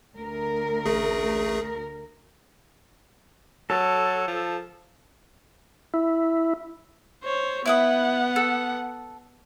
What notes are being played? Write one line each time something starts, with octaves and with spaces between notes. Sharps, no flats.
D2 A#4
A1 A3 G#4
F#3 A4
F3
E4
C5 C#5
B3 E4 B4 F#5 D#6
A4